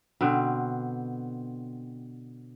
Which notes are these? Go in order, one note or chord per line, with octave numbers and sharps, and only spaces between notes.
B2 D3 C4